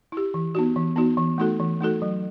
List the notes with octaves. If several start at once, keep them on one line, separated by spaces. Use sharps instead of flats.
E4 G4
E3
B3 D#4 F#4
E3
B3 D#4 F#4
E3
A3 D#4 F#4 A4
E3
A3 D#4 F#4 A4
F#3